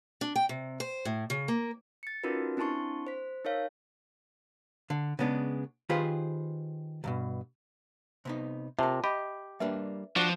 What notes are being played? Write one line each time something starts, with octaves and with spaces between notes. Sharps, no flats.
D4
G5
C3
C5
A2
C#3
A#3
A6 C#7
C#4 D#4 F4 F#4 A#4 B4
C4 D4 E4 A5 C6 C#6
C5 B6
D#4 A#4 C#5 F5
D3
C#3 G#3 B3 D4
D#3 F4 G4 G#4 B4 C5
C#2 G2 B2
C3 B3 D#4
C3 F4 A#4 E5 A5
G4 D#5 B5
G3 A#3 D4 B4 E5
F3 D4 F#4 C5